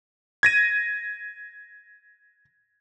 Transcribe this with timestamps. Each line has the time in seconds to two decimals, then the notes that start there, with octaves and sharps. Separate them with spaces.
0.43 G#6 A#6 D#7